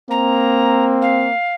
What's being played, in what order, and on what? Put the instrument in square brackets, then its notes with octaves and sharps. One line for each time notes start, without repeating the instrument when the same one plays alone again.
[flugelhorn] A#3 [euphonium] C4 [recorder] A#5
[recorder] F5